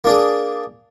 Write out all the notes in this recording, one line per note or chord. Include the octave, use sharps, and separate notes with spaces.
A#3 D4 G#4